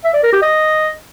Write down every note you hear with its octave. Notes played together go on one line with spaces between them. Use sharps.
E5
D5
A#4
G4
D#5